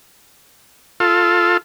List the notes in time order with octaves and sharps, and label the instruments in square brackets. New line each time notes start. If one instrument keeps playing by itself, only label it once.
[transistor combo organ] F4 A4